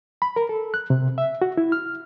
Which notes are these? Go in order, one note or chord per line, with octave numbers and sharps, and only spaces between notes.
B5
A#4
A4
F#6
C3
E5
F#4
E4
F6